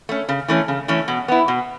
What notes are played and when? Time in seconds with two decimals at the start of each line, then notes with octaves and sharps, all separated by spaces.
0.09 A3 C#4
0.29 C#3
0.48 E3 A3 C#4
0.68 C#3
0.88 E3 A3 C#4
1.08 B2
1.28 B3 E4
1.48 B2